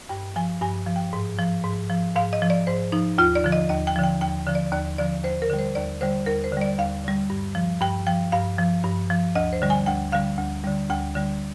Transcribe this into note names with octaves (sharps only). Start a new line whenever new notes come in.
G2 G5
F3 G#5
G2 G#5
F3
G5
G#2
F3
G#2
F3
G#2 F5
D#5
F3
D5
G#2 C5
F3 D#4
D#2 F4
D5
D3 F3
D#5
D#2 D#5
G5
D3 F3
G5
D#2 G5
D3 F3
D5
D#2 D5
D3 F3 D5
D#2 C5
A#4
D3 G3
C5
D#2 D5
D3 G3 C5
D#2 A#4
C5
D3
G3 D5
D#2 F5
D3 G3
G2
F3
G2 G5
F3 G5
G2 F5
F3
G2
F3
D2 D#5
C5
D3 G3
G#5
D2 G5
D3 G3 F5
D2
D3 G3
D2 G5
D3 G3